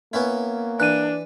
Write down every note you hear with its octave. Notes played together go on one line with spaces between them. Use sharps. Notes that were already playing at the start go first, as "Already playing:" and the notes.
A#3 B3 C#4 E4
E3 D4 F#6 D#7